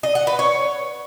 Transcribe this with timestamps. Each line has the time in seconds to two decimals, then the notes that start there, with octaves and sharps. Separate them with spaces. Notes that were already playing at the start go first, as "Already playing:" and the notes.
0.03 D#5
0.15 F#5
0.27 B4
0.39 C#5